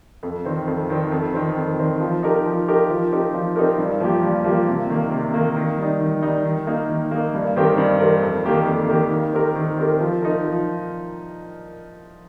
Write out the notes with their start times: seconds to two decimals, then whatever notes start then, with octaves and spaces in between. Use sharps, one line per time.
0.23 F2
0.45 D#3 C4
0.68 F2
0.89 D#3 C4
1.12 F2
1.34 D#3 C4
1.56 F2
1.79 D#3 C4
2.00 F3
2.23 D#4 G4 A#4
2.46 F3
2.68 D#4 G4 A#4
2.90 F3
3.12 C4 D#4 G4 A#4
3.34 F3
3.56 C4 D#4 G4 A#4
3.78 G2
4.00 F3 A#3 G4
4.23 G2
4.44 F3 A#3 G4
4.67 C3
4.90 D#3 A#3
5.11 C3
5.34 D#3 A#3
5.56 D#3
5.78 G3 D#4
6.00 D#3
6.22 G3 D#4
6.45 D#3
6.67 A#3 D#4
6.89 D#3
7.11 A#3 D#4
7.34 G2
7.56 D#3 C4 G4 A#4
7.78 G2
8.00 D#3 C4 G4 A#4
8.22 F2
8.44 D#3 A#3 G4 A#4
8.66 F2
8.89 D#3 A#3 G4 A#4
9.12 D#3
9.34 C4 G4 A#4
9.55 D#3
9.78 C4 G4 A#4
10.00 F3
10.22 D#4 A#4
10.44 F3